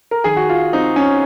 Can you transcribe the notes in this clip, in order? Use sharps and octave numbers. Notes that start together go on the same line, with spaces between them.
A#4
D#3 G#4
F#4
F4
C4 D#4
C#4